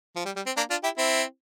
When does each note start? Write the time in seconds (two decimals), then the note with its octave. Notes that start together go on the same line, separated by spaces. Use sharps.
0.16 F3
0.25 G3
0.36 G3
0.46 C4
0.57 A#3 D4
0.70 D4 F4
0.83 E4 G4
0.97 C4 E4